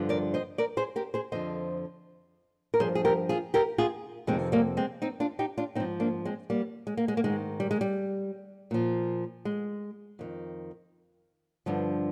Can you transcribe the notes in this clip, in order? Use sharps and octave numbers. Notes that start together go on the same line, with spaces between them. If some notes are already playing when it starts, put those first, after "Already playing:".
Already playing: G2 D3 F3
A#4 D5
C5 D#5
A#4 D5
G#4 C5
G4 A#4
G#4 C5
F2 D3 F3 C5 D#5
A#4
G2 F3 G#4 C5
G#4
G4 A#4
F4 G#4
G4 A#4
F4 G#4
F2 C3 D#3 G#3 C4
G3 A#3
G#3 C4
C4 D#4
D4 F4
D#4 G4
D4 F4
G#2 F3 C4 D#4
A#3 D4
G#3 C4
G3 A#3
G#3
A#3
G#3
A#3
G#2 D#3 G#3
G3
G#3
G3
A#2 F3
G#3
F2 D#3
G2 D3 F3